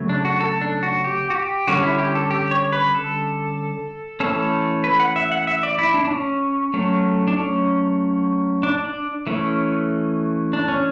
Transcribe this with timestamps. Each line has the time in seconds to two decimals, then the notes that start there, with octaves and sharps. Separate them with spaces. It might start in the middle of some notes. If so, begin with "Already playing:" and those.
Already playing: C#3 F#3 A3 C#4
0.09 D4
0.25 F#4
0.40 A4
0.61 D4
0.83 F#4
1.04 G4
1.30 F#4
1.35 G4
1.67 D3 G3 C#4 F#4
1.83 E4
1.99 G4
2.15 A4
2.30 G4
2.51 C#5
2.73 B4
2.95 A4
4.20 E3 A3 C#4 A4
4.84 B4
5.00 F#5
5.16 E5
5.32 F#5
5.47 E5
5.63 D5
5.78 E4
5.94 D4
6.05 D4
6.10 C#4
6.74 F#3 A3 C#4
7.27 D4
7.37 C#4
8.63 D4
8.84 D4
9.27 E3 A3 C#4
10.53 D4
10.68 C#4